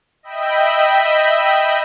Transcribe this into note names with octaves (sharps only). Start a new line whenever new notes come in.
D#5 E5 G5 B5